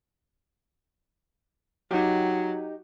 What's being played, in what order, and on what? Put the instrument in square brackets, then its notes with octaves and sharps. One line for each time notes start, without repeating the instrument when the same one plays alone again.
[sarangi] F#3 [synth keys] D#4 G4